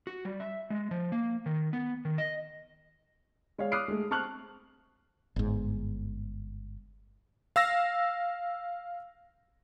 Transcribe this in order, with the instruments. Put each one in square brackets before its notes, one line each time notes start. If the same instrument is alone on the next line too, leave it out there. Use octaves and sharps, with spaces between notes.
[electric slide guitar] F#4
G3
E5
G#3
F3
A#3
D#3
B3
D#3
D#5
[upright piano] G#3 C#5 D5 F5
D6 D#6 F6 F#6 C7 D7
G#3 A3
C4 A5 C#6 F6 F#6 F#7
[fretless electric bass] G1 G#2
[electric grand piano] F5 E6 A#6